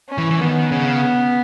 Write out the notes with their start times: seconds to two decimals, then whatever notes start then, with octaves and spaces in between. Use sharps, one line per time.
0.09 C#4
0.18 E3
0.31 E3
0.41 D#3 B3
0.72 C#3